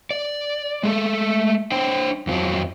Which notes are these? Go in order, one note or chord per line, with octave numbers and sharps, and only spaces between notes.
D5
G#3 A3 A4
D4 C5 G5
F2 F3 F#3